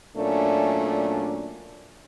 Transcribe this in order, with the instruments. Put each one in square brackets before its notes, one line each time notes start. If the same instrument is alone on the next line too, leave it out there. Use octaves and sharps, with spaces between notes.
[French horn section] A#2 F#3 A3 C#4 D4